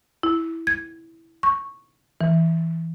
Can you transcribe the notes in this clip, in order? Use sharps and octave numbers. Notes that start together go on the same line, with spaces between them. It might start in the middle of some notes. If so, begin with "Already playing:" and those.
E4
G#6
C#6
E3